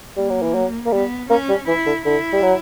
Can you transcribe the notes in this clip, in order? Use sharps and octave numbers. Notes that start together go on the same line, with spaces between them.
G3 A#3
F#3
E3
F#3
A#3
G3 B3
A#3 C#4
G3
E3 E4
D3
D3 E4
G3
F#3